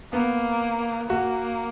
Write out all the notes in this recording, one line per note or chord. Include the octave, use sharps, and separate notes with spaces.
A#3 B3
A#3 F#4